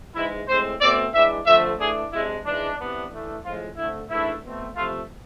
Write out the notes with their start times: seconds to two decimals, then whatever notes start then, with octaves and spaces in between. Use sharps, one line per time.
0.15 G#2 E3 G#3 E4
0.48 A2 G#3 C4 C5
0.81 B2 A3 C4 D5
1.14 E3 G#3 D4 E5
1.46 D3 F3 A3 C4 E5
1.80 E3 A3 D4 G#4
2.12 C3 G#3 D4 E4
2.45 G#2 E3 G#3 D4
2.79 C3 E3 B3 D4
3.11 E3 A3 D4
3.44 A2 F3 G#3 C4 F4
3.77 D3 A3 C4 E4
4.10 G#2 E3 A3 D4 E4
4.43 B2 A3 C4
4.75 C3 F3 A3 F4